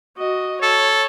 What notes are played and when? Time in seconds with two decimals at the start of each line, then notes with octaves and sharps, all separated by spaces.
0.17 F#4 D#5
0.62 A4 C#5